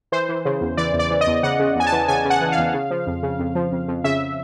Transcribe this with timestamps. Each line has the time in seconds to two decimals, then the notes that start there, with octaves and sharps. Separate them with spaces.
0.12 E3 C5
0.29 E3
0.45 C#3
0.61 E2
0.77 E3 D5
0.94 E2
0.99 D5
1.11 E3
1.21 D#5
1.27 E2
1.43 C#3 F#5
1.60 C#3
1.76 E2 G#5
1.87 A5
1.92 E3
2.08 C#3 G#5
2.25 C#3
2.30 F#5
2.41 E3
2.52 F5
2.58 E2
2.74 C#3
2.91 F3
3.07 F2
3.23 C#3
3.39 F2
3.55 F3
3.72 F2
3.88 F2
4.04 C#3 E5